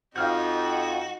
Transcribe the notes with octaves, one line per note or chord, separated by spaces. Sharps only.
F2 D#4 F#4 F5 F6 G6